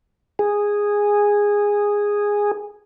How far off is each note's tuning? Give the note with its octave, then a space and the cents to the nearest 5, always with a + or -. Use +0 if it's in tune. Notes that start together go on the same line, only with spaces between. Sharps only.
G#4 -10